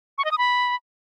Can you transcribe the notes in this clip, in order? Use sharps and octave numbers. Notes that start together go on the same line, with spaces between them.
C#6
D#5
D#6
B5